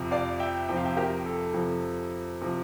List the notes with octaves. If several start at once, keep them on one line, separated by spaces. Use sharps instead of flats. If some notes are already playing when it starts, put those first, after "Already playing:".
Already playing: F2 C3 F3
D5 F5
E5 G5
F2 C3 F3 G5
F5
E5 G5
G4 A#4
A4
F2 C3 F3
C3 F3